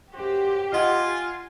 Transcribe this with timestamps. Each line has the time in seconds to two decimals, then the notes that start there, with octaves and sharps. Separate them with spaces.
0.14 F#2 F#4 G4 C5
0.73 F4 D#5 F#5 G#5